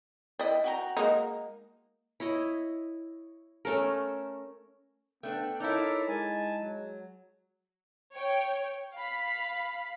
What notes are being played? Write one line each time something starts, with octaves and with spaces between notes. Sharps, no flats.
E4 D5 D#5 G5
F#4 G5 A#5
G#3 A#3 D#4
E4 C#5 D#5
A3 C#4 A4 A#4
A3 B3 D4 G5
D#4 E4 A4 A#4 C#5 D6
G#3 G#5 A5
F#3
C#5 G5
F5 B5